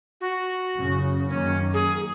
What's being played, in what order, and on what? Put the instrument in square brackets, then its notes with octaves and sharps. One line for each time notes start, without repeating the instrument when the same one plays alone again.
[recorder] F#4
[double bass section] F#1 C#3
[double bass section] F#2 D#3 A#3 [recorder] C#4
[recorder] G#4